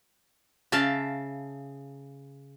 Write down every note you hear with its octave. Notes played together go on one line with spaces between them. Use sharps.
C#3 E5 F5 A5